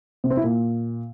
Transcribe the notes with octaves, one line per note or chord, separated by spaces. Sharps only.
C3
C4
E4
A#2